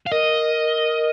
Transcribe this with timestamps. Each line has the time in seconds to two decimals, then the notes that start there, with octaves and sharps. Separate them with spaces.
0.06 F5
0.11 A#4 D#5